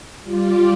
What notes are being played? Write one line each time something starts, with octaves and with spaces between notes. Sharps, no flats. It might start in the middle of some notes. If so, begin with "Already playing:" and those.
G3 F4 D5